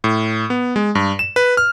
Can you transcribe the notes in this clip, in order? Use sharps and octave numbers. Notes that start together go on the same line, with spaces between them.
A2
B3
G#3
G2
E7
B4
F6